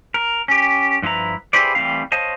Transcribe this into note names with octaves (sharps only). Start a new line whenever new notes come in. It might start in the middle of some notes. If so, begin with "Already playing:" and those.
A#4
C#4 G4
G2 F3 E4 B4 A#5
E4 G4 G#4 B4 C5 D5
E3 G3 A3 C4 F5
C5 C#5 D#5 F5 A5